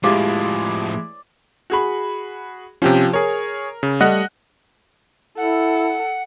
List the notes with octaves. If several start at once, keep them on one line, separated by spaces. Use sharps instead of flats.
A2 F3 G#3 E4 G4 D5 F5
F#4 G#4 B5
C3 F3 C#4 G4
G#4 A#4 C#5
C#3
G3 A3 D#5 F#5 F#6
E4 A4 F#5